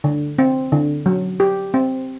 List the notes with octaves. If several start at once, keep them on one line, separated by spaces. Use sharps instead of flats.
D3
C4
D3
F#3
G4
C4